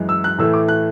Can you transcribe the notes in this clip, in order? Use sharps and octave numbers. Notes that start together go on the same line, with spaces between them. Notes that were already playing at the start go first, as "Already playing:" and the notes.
Already playing: F#2 E3 G#3
E6
F#6
A2 E3 A3 E6
D6
F#6